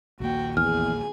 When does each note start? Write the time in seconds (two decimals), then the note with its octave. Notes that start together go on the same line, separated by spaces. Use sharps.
0.20 A#1 D#2 A#3 F#4 G5
0.57 E2 G#4 G#5 F6